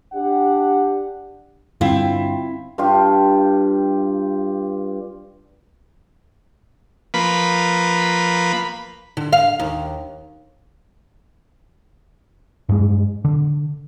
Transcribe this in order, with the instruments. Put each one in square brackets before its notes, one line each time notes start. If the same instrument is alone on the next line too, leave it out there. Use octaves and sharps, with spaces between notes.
[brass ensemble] D4 G4 F#5
[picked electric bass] G2 D3 [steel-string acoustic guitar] C4 E4 G5 [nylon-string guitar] F4
[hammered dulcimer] G2 F4 G4
[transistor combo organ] F3 A#3 B4 B5
[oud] D3
F5
D#2
[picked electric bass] G2 G#3
D3